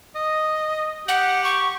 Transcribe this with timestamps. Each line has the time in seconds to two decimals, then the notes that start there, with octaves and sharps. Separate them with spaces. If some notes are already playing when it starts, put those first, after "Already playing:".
0.16 D#5
1.08 G4 F#5
1.44 C#6